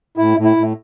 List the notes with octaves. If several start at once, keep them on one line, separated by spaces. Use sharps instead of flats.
A2 E4
A2
E4
A2